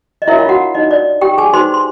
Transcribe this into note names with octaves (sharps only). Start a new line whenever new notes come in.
D#5
D4 E4 F#4 A#4 C#5 E5
F4 F5
F#4 F#5
D#4 D#5
D5
G4 G5
G#4 G#5
D#4 F#4 B4 C5 C6
C6